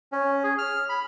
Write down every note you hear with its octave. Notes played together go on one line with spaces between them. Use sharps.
C#4
G#4
F6
B5